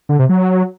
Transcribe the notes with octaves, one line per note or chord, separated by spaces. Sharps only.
D3
C3
F#3